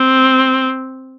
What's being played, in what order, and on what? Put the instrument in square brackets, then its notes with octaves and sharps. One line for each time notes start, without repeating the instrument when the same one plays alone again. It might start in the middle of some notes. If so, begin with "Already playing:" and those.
Already playing: [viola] C4